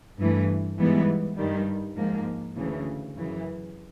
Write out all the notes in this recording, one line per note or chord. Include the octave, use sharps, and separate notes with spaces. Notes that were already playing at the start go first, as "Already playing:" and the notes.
G2 E3 A3
G#2 E3 G3 B3
G2 D#3 G3
G#2 F3 A#3
D2 C#3 E3
F#2 C#3 E3